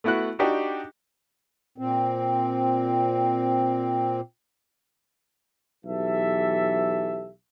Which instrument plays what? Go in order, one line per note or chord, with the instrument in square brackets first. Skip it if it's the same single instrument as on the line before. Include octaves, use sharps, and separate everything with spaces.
[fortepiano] A3 B3 E4 F#4 F#6
D4 D#4 F#4 G4 D5 G5
[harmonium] A#2 C4
[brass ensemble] B1 E3 G4 A4 E5